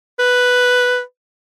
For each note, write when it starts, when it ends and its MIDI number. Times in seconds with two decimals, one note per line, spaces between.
0.19 1.00 71